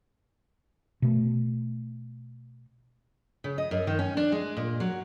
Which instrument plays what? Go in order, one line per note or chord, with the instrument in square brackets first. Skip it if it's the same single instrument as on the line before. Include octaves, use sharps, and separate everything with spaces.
[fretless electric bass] B2 A3
[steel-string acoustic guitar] C#3
D#5
F#2
D#3
C#4
D4
G#3
A#2
F#3